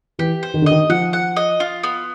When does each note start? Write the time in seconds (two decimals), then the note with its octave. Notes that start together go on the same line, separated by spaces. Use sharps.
0.19 E3 G4
0.43 C5
0.54 D#3
0.62 D3
0.66 D#3 D#5
0.89 F3 F#5
1.13 F#5
1.37 D#5
1.60 F4
1.83 B3